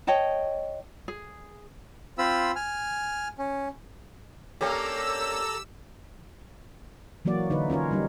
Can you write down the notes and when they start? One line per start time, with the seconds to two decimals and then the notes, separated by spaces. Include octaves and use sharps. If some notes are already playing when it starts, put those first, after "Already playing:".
0.07 C#5 D#5 G5 A5
1.08 G#4
2.18 C4 F4 B5 E6
2.56 G#5 F6
3.38 C#4
4.61 A#3 C#4 D4 G4 A4 A#5 E6
7.25 E3 F#3 A#3 F#4 D5
7.50 D3 D#4 E4 B4
7.70 C#4 F4 A#4 C#5
7.91 G3 D#4